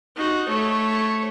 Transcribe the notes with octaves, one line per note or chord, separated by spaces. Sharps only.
D#4 F#4
A3 C#5